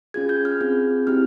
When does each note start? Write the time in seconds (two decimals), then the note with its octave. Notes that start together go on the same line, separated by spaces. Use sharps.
0.14 C#4 F4 G#4 G#6
0.29 G6
0.45 F6
0.61 C4 F4 G#4
1.07 C4 E4 G4 F6